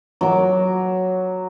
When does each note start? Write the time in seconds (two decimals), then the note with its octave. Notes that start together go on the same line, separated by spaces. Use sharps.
0.21 F#3 D6